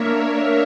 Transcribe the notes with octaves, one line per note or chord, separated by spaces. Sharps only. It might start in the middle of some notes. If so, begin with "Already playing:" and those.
Already playing: A#3 D4 A#4 C#5 E5